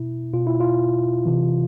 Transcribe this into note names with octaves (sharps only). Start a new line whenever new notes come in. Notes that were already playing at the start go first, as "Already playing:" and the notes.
Already playing: B2 E4
B2 F4
E4
F4
C3 E3